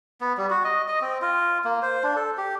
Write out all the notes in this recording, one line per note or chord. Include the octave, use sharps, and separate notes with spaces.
B3
G3
F#4
D#5
D#5
C4
F4
A#3
C5
D4
A4
G4